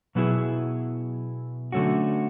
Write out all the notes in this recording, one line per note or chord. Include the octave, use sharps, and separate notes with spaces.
B2 F#3 B3 E4 G#4
D3 F#3 A3 C#4 F#4